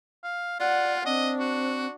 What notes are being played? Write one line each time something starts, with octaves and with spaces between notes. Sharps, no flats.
F5
F4 D5 F#5
C4 D4 D#5
F#4